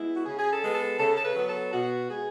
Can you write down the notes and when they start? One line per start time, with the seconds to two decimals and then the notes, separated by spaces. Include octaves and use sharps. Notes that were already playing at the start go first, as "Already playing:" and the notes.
Already playing: G#3 B3 E4
0.17 F#4
0.25 C#3 G#4
0.39 G#4
0.51 A4
0.63 G#3 B3
0.75 A4
1.00 C#3 A4
1.17 A4
1.24 B4
1.36 F#3 B3
1.49 A4
1.73 B2 F#4
2.10 G#3 B3 G#4